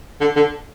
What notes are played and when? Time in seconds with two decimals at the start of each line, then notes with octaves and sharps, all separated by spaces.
0.21 D3
0.36 D3